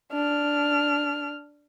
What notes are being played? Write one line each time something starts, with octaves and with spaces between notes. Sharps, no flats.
D4 F6